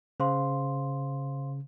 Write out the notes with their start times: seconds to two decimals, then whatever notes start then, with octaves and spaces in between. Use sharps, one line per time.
0.20 C#3 C5 F5 C6